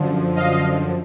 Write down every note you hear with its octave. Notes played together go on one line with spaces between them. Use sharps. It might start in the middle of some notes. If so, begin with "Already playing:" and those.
Already playing: F#2 D3 F3
D#5 F5